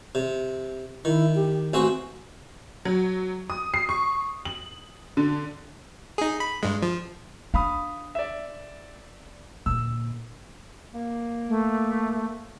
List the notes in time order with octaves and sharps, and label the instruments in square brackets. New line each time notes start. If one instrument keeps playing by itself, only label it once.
[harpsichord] C3
[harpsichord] D#3 [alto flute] E4
[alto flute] G4
[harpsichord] A1 C4 F#4 [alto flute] G#5
[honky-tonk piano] F#3
D#6
C7
C#6
F#7
D3
[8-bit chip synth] D#4 G#4
B5
G2 G#3
F3
[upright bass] D4 [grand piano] F5 B5 D#6
[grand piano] D5 E5
[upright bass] A#2 D3 [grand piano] E6
[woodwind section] A#3
[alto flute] A3